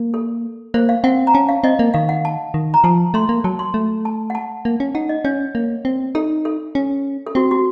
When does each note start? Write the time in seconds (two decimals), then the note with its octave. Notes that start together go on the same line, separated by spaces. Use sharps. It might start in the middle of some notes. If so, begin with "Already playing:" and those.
Already playing: A#3
0.14 A4
0.74 A#3 C5
0.89 F5
1.04 C4 F#5
1.27 A#5
1.34 C#4 A5
1.48 F5
1.64 C4 D#5
1.79 A#3
1.94 D#3 F5
2.09 F#5
2.25 A5
2.54 D#3
2.74 A#5
2.84 F3 A5
3.14 A3 C6
3.29 A#3
3.44 F#3 A5
3.59 C6
3.74 A3
4.05 A5
4.30 F#5
4.35 A5
4.65 A#3
4.80 C#4
4.95 D#4 F#5
5.09 D#5
5.25 C#4 C#5
5.55 A#3
5.85 C4
6.15 D#4 A4
6.45 A4
6.75 C#4
7.27 A4
7.35 C4 F#4
7.51 F#4